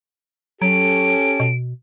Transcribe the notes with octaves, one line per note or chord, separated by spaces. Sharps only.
F#3 C#4 G4 A4 D7
B2